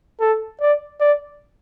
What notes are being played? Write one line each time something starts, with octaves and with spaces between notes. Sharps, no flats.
A4
D5
D5